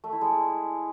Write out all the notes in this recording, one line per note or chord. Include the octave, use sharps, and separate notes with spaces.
A3
E4
G#3